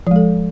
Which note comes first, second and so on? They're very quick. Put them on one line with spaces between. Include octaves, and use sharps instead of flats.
F3 G#3 A4